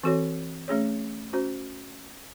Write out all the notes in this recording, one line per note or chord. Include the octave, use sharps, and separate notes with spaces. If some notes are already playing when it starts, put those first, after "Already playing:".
E3 C4 F#4 A4 C#5
A3 C#4 G#4 C#5
C#4 F#4 C5